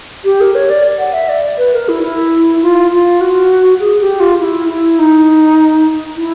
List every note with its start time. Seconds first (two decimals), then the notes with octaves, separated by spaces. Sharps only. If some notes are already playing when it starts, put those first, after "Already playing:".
0.25 G4
0.41 A#4
0.55 C#5
0.70 D5
0.99 F#5
1.14 E5
1.29 D5
1.58 B4
1.73 A#4
1.89 E4
2.03 E4
2.63 F4
2.92 F4
3.21 F#4
3.80 G#4
4.00 G4
4.20 F4
4.39 E4
4.69 E4
4.99 D#4
6.17 E4